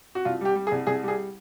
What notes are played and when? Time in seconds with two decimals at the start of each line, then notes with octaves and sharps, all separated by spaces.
0.15 F#4
0.25 C2 F4
0.41 G3 G4
0.56 G3
0.67 G#4
0.72 C2
0.87 C2 G#4
1.03 G3 G#4